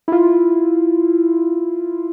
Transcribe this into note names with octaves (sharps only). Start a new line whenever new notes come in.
E4 F4